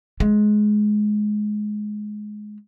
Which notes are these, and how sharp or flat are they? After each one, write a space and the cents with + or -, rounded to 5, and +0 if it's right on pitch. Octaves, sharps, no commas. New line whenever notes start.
G#3 +15